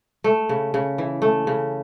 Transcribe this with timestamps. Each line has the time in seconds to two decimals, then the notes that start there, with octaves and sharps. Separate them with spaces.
0.24 A3
0.49 C#3
0.74 C#3
0.98 E3
1.22 A3
1.47 C#3